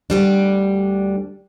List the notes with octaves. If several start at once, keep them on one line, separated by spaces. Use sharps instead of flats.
D2 G3 D4